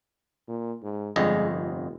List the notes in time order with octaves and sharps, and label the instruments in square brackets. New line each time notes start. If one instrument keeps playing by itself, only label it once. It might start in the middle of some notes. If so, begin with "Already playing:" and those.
[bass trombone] A#2
G#2
[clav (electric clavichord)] G1 F2 D#5 [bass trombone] G#3
[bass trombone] F1